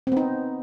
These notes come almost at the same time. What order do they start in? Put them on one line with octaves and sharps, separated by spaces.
C4 B3 D#4